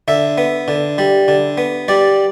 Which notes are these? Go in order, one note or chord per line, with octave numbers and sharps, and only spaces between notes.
D3 E5
B3
D3
G3
D3
B3
G3 D5